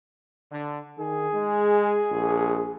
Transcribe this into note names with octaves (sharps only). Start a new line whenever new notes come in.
D3
D#3 G#4
G#3
A#1